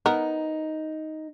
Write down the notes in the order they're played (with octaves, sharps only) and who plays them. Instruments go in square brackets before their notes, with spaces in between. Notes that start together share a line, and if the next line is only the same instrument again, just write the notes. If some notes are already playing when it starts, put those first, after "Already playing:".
[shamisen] B3 A#4 [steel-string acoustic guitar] D#4